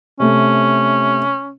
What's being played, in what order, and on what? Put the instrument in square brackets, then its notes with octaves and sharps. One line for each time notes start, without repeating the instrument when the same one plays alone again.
[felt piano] C3 A3 [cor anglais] C#4